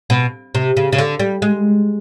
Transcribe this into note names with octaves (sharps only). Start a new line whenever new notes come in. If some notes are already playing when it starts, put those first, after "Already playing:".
B2
C3
C#3
C#3
D3
G3
G#3